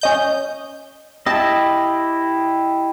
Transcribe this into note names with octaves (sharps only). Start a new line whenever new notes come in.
C#4 D#5 G6
E4 G4 D#5 A5